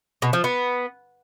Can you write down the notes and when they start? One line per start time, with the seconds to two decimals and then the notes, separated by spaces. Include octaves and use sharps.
0.22 B2
0.33 F3
0.44 B3